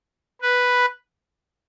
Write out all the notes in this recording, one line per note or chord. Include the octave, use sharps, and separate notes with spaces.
B4